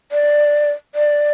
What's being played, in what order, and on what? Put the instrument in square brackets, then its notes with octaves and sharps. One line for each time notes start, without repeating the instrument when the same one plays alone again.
[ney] D5
D5